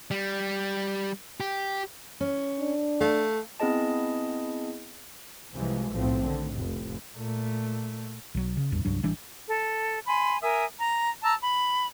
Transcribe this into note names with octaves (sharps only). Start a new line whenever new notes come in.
G3
G4
C#4
D4
A3 F5
B3 C4 E4 G#4 D#5 A5
C2 C3 E3 F3 G#3
B1 A2 F3 A3 C4
D3 D#3
F1 A2
A#2 A3
B1 F#3
C#3
A1 E2 G2
C2 G2 F#3 D4
A1 E3 G3 D4
A4
G#5 B5 C6
A#4 E5 G#5 D#6
A#5
A5 A#5 E6
B5